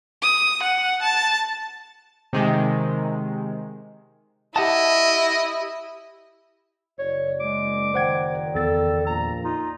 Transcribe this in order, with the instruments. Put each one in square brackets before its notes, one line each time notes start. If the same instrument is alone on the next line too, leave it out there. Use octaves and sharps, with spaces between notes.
[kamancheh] D#6
F#5
A5
[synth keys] C3 D#3 G#3
[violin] E4 [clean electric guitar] G4 F#5 A5 [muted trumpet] D#5
[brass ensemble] F#1 D5 [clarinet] C#5
[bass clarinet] G#3 [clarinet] D6
[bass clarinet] D#3 [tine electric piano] C5 F#5 G#6
[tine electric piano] E2 A6 [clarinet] A4
[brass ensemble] A#1 A#2 [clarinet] A#5
[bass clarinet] D#4 [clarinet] F4